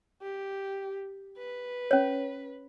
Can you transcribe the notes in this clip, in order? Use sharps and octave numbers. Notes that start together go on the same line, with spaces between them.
G4
B4
C#4 C#5